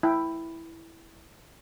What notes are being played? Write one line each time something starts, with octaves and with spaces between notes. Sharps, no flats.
E4 G5